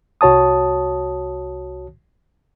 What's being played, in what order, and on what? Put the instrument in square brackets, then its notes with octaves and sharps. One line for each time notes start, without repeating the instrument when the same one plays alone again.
[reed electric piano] C2 F#4 C#5 A5 D#6